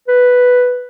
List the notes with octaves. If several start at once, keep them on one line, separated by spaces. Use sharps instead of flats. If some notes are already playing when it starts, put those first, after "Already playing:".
B4